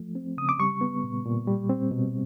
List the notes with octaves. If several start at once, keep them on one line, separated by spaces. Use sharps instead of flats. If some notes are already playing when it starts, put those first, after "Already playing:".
Already playing: F3 A3
C4
C#3 D#6
D6
G3 C#6
B3
A#2
A#2
G3
C4
B2